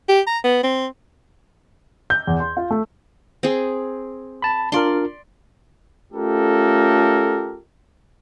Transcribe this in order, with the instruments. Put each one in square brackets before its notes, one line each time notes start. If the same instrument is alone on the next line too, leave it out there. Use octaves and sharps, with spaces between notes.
[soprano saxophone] G4
A#5
B3
C4
[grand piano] G6
E2
C6
F4
A3
[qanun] C4 G#4
[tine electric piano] A5 B5
[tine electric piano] D4 F4 A#4 [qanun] D5 C6
[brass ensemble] A3 C#4 F4 G4 A4 A#4